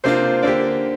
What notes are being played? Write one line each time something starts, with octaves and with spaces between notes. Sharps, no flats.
C3 A#3 D4 F4 C5
D3 A#3 G4 D5